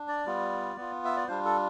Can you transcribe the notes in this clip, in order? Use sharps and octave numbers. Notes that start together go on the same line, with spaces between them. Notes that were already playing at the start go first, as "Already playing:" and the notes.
Already playing: D4
D5
G3 B3 F4
B3 F4
E5
D5
G3 D4 F4 C5
A4